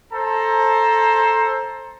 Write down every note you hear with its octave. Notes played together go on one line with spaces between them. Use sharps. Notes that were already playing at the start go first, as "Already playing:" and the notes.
A4 C5 A5 A#5